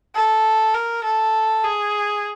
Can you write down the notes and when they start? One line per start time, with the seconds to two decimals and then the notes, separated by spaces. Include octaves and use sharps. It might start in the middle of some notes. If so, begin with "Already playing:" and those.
0.15 A4
0.74 A#4
1.04 A4
1.64 G#4